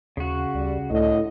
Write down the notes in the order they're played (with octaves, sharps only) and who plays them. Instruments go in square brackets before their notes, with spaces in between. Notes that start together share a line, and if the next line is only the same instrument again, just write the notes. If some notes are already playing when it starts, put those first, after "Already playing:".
[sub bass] D#2 [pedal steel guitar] C#3 F#4
[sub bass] D2 [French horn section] G3
[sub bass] C#2 [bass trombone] A2 [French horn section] D3 D#5